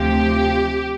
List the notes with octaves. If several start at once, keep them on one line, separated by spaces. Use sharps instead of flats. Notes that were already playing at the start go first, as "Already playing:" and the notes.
Already playing: D2 C3 F3 G4